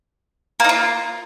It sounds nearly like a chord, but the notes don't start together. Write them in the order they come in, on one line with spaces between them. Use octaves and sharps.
A#3 D#4 F4